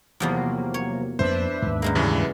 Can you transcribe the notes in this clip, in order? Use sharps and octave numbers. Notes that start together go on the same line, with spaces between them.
E2 C3 F3 F#3 A#3 B3
C#5
F2 A#3 D4 B4 C5 E5
D#2 G#2
F#2 G#3 A#3
G2 C#3 E3